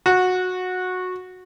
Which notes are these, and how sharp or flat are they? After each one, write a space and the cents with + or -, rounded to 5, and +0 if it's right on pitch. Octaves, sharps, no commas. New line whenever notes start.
F#4 -15